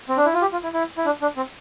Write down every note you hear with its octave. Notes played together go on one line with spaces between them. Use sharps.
C4
D4
E4
F4
G4
F4
E4
E4
E4
D4
D4
C4